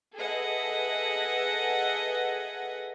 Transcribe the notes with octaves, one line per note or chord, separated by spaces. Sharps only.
G#4 A4 B4 D#5 E5 F#5